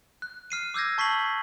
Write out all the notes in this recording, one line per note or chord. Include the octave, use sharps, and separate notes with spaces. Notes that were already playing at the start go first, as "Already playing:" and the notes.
F#6
F6 C7 D#7
D6 E6 G6 G#6 A#6
A5 C#6 B6 C7 F#7